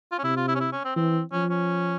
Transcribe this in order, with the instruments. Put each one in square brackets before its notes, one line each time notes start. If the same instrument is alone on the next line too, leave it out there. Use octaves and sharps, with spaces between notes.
[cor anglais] F4
C#4
[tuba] C3 [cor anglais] E4
[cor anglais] F4
E4
C#4
E4
C#4
C4
[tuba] E3 [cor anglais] C4
[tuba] F3 [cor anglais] C#4
[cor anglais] C#4